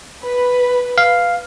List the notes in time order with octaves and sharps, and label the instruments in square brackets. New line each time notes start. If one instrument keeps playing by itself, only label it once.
[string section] B4
[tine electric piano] F5